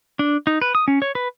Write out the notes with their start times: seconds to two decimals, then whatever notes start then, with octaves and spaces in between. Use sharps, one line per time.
0.19 D4
0.47 D#4
0.62 B4
0.75 D#6
0.88 C#4
1.02 C#5
1.15 B4